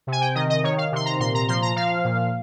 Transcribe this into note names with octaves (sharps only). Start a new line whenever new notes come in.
C3
G#5
G5
D#3 D#5
D#5
D#3 C#5
F5
C3 C6
A#5
A#2 C6
A#5
F3 C6
A#5
F3 F5
A#2